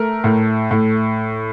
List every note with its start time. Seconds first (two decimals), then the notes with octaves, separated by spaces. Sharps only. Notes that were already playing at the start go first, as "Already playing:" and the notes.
Already playing: A3 A#4
0.24 A2
0.71 A2